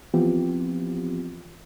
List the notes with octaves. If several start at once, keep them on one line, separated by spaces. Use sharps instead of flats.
E3 F3 B3 C4 F4 G4